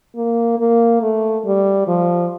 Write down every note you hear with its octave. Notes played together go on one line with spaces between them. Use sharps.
A#3
A#3
A3
G3
F3